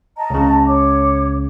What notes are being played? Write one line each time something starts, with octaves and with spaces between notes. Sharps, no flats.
D#5 A5 A#5
C#2 C#3
C#5 D6